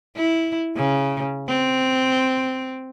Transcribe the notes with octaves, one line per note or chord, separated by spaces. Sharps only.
E4
C#3
C4